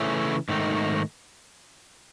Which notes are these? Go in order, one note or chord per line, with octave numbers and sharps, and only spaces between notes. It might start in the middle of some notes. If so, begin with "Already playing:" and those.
Already playing: C#3 E3 A3 C#4
G#2 D#3 A3 D#4